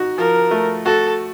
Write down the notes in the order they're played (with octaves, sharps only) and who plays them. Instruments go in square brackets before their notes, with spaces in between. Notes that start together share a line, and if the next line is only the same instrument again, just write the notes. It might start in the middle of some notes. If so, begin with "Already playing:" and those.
Already playing: [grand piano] D#4 F#4
[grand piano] F3 [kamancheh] A#4
[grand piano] A3
[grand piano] F#4 [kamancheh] A4